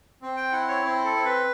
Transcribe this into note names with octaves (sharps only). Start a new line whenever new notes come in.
C4
G5
E4 F#5
C#5
C4
A4
C4
B4